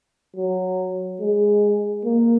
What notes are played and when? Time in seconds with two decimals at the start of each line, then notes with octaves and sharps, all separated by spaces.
0.36 F#3
1.21 G#3
2.05 A#3